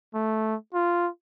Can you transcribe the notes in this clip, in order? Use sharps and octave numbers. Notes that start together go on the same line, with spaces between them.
A3
F4